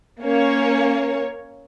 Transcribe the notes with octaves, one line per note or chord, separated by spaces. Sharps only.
A#3 C#4 C#5